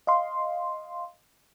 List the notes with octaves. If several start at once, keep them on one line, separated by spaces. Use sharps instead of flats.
D#5 F5 C6